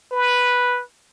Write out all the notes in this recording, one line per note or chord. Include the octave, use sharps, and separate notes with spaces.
B4